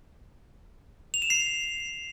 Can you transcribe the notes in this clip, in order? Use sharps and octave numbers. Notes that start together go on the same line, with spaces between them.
F7
E7
C7